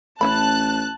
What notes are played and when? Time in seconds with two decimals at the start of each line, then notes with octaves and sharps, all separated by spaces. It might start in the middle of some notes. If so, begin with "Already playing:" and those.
0.21 A1 C#4 E4 A5 B5 F#6